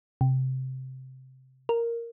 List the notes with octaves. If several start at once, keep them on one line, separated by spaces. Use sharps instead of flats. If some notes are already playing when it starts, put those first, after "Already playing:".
C3
A#4